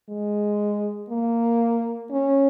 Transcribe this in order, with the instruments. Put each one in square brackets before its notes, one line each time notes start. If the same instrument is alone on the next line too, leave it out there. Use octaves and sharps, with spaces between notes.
[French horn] G#3
A#3
C#4